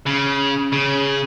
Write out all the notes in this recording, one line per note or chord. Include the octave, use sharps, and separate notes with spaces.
C#3
C#3